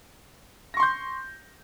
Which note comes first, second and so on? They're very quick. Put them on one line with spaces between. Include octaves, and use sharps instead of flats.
A#6 C#6 C6 G6